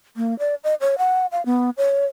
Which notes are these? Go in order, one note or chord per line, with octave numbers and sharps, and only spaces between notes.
A#3
D5
D#5
C#5
F#5
F5
B3
C#5